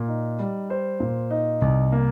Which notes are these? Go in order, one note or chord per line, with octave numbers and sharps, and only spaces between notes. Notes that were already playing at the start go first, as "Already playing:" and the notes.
Already playing: A#2
D#4
G3
C5
A#2
D#4
C2
A#3